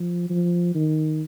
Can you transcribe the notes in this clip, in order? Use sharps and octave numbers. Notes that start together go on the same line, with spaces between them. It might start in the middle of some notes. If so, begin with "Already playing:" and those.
Already playing: F3
F3
D#3